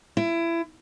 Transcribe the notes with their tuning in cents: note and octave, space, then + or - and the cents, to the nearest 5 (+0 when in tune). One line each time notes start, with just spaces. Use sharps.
E4 +25